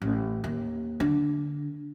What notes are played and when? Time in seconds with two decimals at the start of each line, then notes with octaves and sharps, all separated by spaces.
0.02 A1
0.44 D#2
1.00 D3